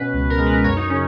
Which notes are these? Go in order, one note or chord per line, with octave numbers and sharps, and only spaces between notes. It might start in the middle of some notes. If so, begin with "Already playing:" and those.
Already playing: B2 C#4 B4
C#2
A#4
G#3
B4
F#2 C#5
D#4
C#3 C#4